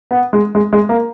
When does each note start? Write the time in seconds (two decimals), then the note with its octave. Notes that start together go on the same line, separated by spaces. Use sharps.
0.11 B3
0.33 G#3
0.55 G#3
0.73 G#3
0.89 A#3